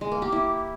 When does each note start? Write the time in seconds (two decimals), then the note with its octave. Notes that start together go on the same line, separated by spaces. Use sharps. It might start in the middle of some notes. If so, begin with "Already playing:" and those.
0.01 G#3
0.12 A#3
0.22 G4
0.32 E4